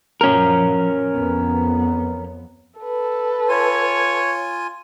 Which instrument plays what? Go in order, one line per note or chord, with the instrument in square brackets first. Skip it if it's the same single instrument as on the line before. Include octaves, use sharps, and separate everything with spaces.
[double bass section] F#2 A#2 F3 [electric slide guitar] C#4 A#4
[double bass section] F2 B3
[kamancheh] A4 B4
[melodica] F4 G#5 [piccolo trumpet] C#5